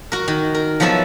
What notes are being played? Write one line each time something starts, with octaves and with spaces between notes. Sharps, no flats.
F#4 A#4
D#3
A#4
F3 F#3 B3 F#4 A4 E5